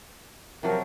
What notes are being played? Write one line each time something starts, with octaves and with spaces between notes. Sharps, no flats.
C3 F3 F#3 A#4